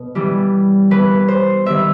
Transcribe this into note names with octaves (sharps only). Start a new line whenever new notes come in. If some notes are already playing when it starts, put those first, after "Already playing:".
Already playing: B2
E3 G3 B3
E3 B3 B4
C5
D#3 G3 B3 E5